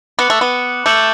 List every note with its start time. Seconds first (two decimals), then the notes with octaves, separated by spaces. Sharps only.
0.19 B3 D6 F#6 C#7 F#7
0.30 A3
0.41 B3
0.86 A3 D6 G6 C#7 F#7